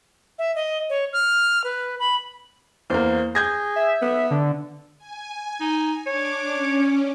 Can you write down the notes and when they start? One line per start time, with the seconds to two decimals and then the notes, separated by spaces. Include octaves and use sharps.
0.39 E5
0.56 D#5
0.90 C#5
1.13 F6
1.64 B4
2.00 B5
2.90 E2 A#3 C5
3.35 G#4 G6 G#6 A#6
3.76 E5
4.02 B3
4.31 D3
4.98 G#5
5.60 D#4
6.06 D4 C#5 D6
6.52 C#4